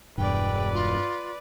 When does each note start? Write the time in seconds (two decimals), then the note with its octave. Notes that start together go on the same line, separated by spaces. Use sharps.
0.18 E1 G2 B4 D5 G5
0.73 F4